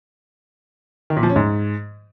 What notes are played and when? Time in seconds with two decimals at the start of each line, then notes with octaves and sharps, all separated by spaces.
1.10 D#3
1.17 A#2
1.23 F3
1.29 C#4
1.36 G#2